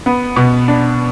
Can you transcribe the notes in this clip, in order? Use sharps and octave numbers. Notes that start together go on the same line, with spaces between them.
B3
B2
D4